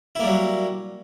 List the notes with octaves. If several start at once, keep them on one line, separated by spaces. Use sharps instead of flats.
F#3 G3 A#3 E4